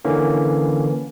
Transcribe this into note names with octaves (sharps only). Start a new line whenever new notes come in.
D3 E3 A#3 C#4